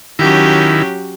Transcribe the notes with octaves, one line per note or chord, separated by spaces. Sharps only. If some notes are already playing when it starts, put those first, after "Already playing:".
D#3 F#3 C#4 E4 G4